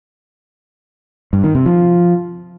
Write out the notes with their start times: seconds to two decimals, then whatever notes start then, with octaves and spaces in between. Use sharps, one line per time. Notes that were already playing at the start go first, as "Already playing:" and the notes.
1.33 G2
1.44 D#3
1.55 C3
1.66 F3